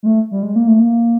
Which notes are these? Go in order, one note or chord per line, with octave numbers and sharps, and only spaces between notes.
G#3
A3
G3
G#3
A#3
A3
A#3